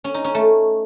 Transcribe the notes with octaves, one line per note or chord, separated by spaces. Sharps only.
C#4
D#4
C#4
A3